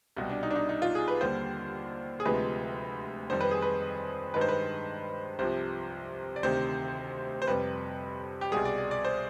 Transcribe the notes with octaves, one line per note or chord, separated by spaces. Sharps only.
C2 B2 G3
D4
D#4
D4
D#4
D#4
F4
G#4
B4
D#2 D3 G3 C5
G#4
D2 C3 F3 G#3 B4
F2 D#3 G3 C5
B4
G#4
B4
G2 D#3 G#3 B4
C5
B4
C2 C3 F3 C5
D5
D2 C3 D#3 C5
C5
F2 C3 G3 B4
G4
C2 B2 G3 G#4
D5
D5
D5
C5